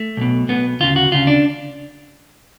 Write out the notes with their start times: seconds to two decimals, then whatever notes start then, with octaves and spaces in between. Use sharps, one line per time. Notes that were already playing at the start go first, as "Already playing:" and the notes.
Already playing: A3
0.17 B1 B2
0.49 B1 B2 B3
0.80 D2 C#3 F4
0.96 F#4
1.12 D2 C#3 F4
1.27 D4